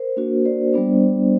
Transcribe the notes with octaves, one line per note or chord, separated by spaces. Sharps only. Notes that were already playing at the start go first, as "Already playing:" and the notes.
Already playing: A#4 C5
A#3 D4 F#4
C5 D5
G3 B3 D4